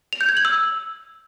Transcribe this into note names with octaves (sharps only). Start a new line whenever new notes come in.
F7
G6
G#6
F#7
E6